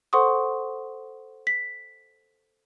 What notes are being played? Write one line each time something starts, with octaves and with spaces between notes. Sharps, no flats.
A4 C5 F#5 C6 C#6 D#6
B6